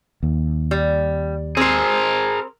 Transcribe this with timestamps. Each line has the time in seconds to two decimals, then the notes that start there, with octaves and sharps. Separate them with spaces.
0.23 D#2
0.71 G3
1.57 C4 G#4 A#4 C5